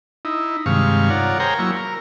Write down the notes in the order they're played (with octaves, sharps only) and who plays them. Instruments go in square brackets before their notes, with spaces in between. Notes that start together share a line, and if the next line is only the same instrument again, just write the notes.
[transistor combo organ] D#4 E4
G2 C3 D#3 G#3 F5 C#6
F4 A#4 C#5 D5 F#5
G#4 A#4 C5 C#5 G5 A#5
F#3 A#3 E4 C#6
A#4